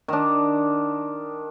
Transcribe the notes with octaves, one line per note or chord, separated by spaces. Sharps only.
D#3 D4